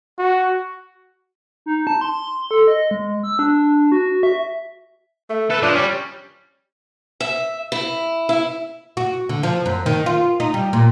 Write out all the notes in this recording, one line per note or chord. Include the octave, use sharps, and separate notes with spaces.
F#4
D#4
A5
C6
C6
A4
D#5
G#3
E6
D4
F#4
E5
A3
A4 B4 E5
F3 D4
G3 C#4
E5
E4
E4
F#4
D3
F3
F#2
D#3
F4
D#4
G3
A#2